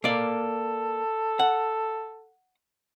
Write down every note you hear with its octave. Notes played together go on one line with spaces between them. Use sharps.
A#3 A4 D5
F#5